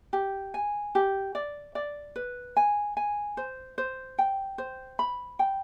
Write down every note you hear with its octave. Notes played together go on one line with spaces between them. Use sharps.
G4
G#5
G4
D5
D5
B4
G#5
G#5
C5
C5
G5
C5
B5
G5